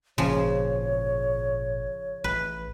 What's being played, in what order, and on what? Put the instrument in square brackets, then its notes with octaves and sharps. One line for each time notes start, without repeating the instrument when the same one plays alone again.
[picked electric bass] G#1 A#2 [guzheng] C#3 F3 [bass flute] C#5
[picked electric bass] A1 [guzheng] B4